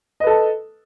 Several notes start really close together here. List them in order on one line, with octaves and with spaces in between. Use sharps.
D#5 B4 A4 A5